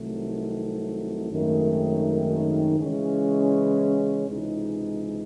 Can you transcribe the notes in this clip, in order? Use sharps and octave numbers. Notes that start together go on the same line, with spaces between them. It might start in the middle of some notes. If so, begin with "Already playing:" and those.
Already playing: C2 C3 D#3 F#3 A3
G#1 F#2 D#3 A3
C#3 E3 G#3 C#4 E4
C#2 C3 E3 G#3 D#4